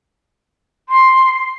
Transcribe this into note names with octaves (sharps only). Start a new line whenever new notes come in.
C6